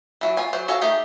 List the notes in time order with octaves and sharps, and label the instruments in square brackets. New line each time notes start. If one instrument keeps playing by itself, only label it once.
[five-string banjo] E3 F#3
F4 G#5
F#3 C5
F#4 A4 C#5 F5 G#5
A3 D#4 G4 G#4